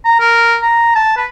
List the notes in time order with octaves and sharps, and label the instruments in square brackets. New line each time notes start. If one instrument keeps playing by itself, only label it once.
[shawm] A#5
A#4
A#5
A5
B4